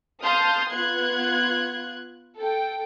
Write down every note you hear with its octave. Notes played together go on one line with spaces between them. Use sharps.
F5 A5 C6 D#6 F6 G6
B3 F4 F#6 G#6
A4 G5